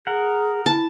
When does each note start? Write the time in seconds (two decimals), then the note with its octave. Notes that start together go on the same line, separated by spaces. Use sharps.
0.07 G#4 A#4 F#5
0.66 E4 A5